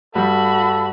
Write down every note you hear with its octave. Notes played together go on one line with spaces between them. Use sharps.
G2 G3 F#4 A4 B5